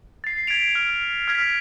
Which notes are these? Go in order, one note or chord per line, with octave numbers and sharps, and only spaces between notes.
A6 C7
G#6 B6 C7 D7 F7
F6
F6 G#6 B6